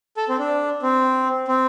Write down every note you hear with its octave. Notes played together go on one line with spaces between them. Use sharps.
A4
C4
D4
C4
C4